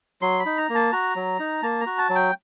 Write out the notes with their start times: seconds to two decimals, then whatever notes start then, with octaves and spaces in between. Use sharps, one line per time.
0.22 F#3 C6
0.39 B5
0.46 D#4
0.58 A#5
0.69 A#3
0.75 A5
0.92 F#4 A#5
1.16 F#3
1.39 D#4
1.63 A#3 A5
1.81 A#5
1.86 F#4
1.98 A5
2.10 F#3
2.15 G5